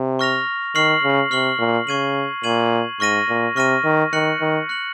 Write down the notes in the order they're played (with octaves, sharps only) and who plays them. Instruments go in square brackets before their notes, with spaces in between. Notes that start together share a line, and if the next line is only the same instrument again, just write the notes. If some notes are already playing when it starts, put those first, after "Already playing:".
Already playing: [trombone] C3
[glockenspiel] C#6 F6 A#6 F7
[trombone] D#3 [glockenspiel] C#6 F6 C7 F#7
[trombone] C#3
[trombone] C3 [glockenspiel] C#6 F6 C7 F#7
[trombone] A#2
[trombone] C#3 [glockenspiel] C#6 G#6 D#7 F#7
[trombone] A#2 [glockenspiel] C#6 G#6 D#7 F#7
[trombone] G#2 [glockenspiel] C#6 F6 A#6 D#7
[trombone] A#2
[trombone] C3 [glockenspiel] C#6 F6 A#6 D#7
[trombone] D#3
[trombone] D#3 [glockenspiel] F#6 C#7 F#7
[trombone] D#3
[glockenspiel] F#6 C#7 F#7